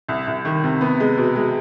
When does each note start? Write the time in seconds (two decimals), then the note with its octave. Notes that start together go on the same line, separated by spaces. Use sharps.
0.09 C2
0.27 C2
0.45 D#3
0.64 C3
0.81 B3
1.00 G#3
1.18 B2
1.36 G#3